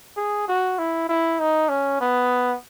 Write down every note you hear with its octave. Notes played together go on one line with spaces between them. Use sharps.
G#4
F#4
E4
E4
D#4
C#4
B3